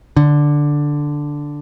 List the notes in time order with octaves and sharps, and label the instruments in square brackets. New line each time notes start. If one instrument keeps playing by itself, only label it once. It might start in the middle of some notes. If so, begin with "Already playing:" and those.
[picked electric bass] D3